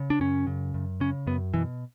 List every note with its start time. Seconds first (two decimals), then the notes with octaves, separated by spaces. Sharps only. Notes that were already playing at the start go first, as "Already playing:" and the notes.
Already playing: C#3
0.10 D4
0.20 F#2 C#4
0.47 C#3
0.74 F#2
1.00 C#3 C#4
1.27 F#2 B3
1.54 B2 E3